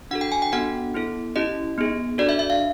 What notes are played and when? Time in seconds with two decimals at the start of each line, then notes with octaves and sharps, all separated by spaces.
0.11 D4 F#4 A4 F#5
0.21 G5
0.32 G#5
0.42 G5
0.52 B3 D4 F#4 A4 F#5
0.94 B3 E4 A4
1.36 C#4 E4 G4 D#5
1.78 B3 D#4 G#4
2.18 D4 F#4 A4 D5
2.29 E5
2.39 E5
2.50 F5